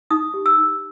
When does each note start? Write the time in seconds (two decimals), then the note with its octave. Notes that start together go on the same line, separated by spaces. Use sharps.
0.11 D#4 D#6
0.34 G4
0.46 E6
0.58 D#4